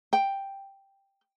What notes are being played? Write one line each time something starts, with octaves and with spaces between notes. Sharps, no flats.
G5